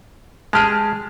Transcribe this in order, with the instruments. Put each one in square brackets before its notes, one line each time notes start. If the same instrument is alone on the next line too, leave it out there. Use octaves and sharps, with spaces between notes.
[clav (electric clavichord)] G#3 G4 G#4 [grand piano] A5 F6